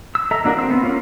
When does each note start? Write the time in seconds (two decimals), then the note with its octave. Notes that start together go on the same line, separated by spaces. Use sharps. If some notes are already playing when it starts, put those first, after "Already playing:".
0.15 E6
0.31 A4 D#5 E5 A#5
0.44 E3 A#3 D4 F#4 A#4
0.58 C4 E6
0.71 B3 C4
0.83 A#3 C#4 F4